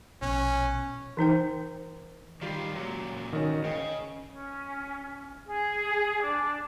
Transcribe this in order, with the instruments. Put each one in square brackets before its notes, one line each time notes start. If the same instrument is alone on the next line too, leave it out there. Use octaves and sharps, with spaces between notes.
[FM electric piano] A#1 B2 F#6 [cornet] C#4
[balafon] E3 D#4 C5 G5
[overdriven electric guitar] D#3 C5 [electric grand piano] G3 F4 G4
[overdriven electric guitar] F#2 A#2 [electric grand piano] F#3
[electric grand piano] G#1 F#4 [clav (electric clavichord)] D#3 C#4
[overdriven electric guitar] C#3 [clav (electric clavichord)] D#5 [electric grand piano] G5
[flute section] C#4
G#4
D4